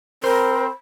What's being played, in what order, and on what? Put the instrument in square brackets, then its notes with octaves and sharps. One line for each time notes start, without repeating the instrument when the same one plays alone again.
[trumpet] C4 [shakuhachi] A#4 [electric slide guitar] C5 [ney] B5